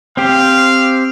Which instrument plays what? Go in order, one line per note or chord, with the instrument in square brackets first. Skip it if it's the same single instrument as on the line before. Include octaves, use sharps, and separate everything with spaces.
[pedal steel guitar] C4 G4 C5 [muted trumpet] F5